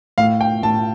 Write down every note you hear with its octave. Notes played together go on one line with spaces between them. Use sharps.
A2 F5
G5
A2 A5